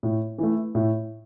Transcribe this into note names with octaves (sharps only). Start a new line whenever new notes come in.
A2
E3 A3
A2